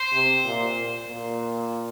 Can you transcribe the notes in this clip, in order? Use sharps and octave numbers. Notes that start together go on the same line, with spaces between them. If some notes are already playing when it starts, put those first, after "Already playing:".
Already playing: C5
C3
A#2
A#2